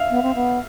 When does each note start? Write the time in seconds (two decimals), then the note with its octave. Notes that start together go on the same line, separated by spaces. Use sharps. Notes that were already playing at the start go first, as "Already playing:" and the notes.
Already playing: E5 F5
0.10 B3
0.22 C4
0.35 B3